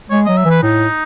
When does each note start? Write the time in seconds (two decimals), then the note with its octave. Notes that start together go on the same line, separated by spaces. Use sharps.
0.10 G#3 C#5
0.25 F#3 D#5
0.37 E5
0.45 E3
0.50 B4
0.63 A2 D#4